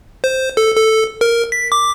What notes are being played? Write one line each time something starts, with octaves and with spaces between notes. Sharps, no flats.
C5
A4
A4
A#4
B6
D6